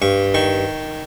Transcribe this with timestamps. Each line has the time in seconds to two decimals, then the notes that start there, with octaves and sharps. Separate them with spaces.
0.02 G2 C#6
0.34 D#3 C#6